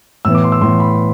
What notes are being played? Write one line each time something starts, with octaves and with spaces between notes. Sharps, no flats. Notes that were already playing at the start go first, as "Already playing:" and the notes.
A2 E3 B3 E6
D6
C6
E6
A2 E3 B3 C6
B5